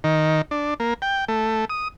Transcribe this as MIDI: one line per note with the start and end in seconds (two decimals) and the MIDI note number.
0.04 0.42 51
0.51 0.74 62
0.80 0.94 58
1.02 1.25 79
1.28 1.65 57
1.70 1.88 87